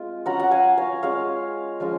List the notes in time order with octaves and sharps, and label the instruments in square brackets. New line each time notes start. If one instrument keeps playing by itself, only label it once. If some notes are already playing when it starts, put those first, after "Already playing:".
Already playing: [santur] G#3 C4 F4
F#3 C#4 F4 F#5 A#5
F#5
F5 G#5
C#5 F5
G#3 C#4 F4 C#5 F5
F3 G#3 C#4 F4